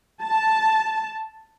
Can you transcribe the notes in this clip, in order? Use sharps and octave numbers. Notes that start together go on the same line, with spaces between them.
A5